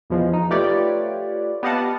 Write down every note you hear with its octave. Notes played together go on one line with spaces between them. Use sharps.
E2 B2 F3 G#3
D#4
A3 F4 G4 B4 C#5 D5
B3 G4 D#5 F5 F#5 A5